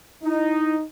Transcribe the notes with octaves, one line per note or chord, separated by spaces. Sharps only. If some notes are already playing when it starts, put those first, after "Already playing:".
D#4 E4